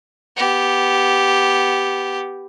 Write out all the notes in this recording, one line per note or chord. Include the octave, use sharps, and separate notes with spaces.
B3 G4